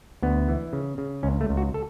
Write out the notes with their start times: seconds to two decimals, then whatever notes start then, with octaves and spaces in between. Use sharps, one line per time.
0.22 D2 B3
0.48 E3
0.73 C#3
0.98 C#3
1.23 C#2 C#4
1.41 A3
1.49 C#2
1.57 F#4
1.74 A4